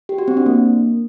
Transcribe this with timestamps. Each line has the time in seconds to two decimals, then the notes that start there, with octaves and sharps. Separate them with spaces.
0.09 G4
0.18 F#4
0.28 C4
0.37 D4
0.46 A#3